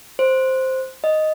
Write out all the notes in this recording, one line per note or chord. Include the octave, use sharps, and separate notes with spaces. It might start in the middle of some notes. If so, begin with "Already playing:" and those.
C5
D#5